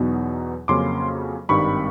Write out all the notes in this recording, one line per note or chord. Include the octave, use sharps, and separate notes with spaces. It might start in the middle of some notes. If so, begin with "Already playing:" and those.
Already playing: E2 B2 F#3 B3 D#4
F2 C#3 F#3 A#3 C#4 C6 D6
G#1 G2 D#3 G3 C4 B5 C#6